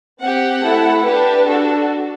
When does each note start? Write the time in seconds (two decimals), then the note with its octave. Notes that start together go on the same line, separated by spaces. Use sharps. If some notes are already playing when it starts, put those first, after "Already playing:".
0.20 C4 G4 F#5
0.62 A3 E4 A4
1.04 D4 G4 B4
1.46 D4 F#4 A4